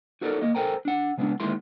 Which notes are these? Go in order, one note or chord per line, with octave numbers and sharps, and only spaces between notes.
D#4 F#4 A4 A#4 D5
A#3 D#5
A4 A#4 C5 G5 G#5 A#5
D4 F#5
C#3 G#3 B3 C#4 D4
D2 D#3 G#3 A#3 E4 C6